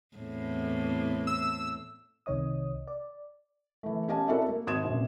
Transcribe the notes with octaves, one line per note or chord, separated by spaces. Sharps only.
E2 A2 C4
E6
C2 C3 D#3 C#5 D#5 D#6
D5
E3 A3
C#4 G4 D#5 F5 G#5 A5
C4 D4 E4 F#4 A4 A#4
A#3
G#1 F#4 C6 D#6 G#6 E7
F1 A#1 F#2